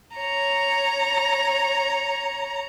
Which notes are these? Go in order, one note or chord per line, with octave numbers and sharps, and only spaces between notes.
C#5 A#5